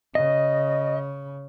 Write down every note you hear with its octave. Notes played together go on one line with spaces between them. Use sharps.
C#3 D#5